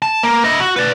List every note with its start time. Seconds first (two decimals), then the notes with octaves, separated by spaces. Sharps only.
0.02 A5
0.23 A#3
0.44 E4 D#5
0.60 F#4
0.76 B4 D5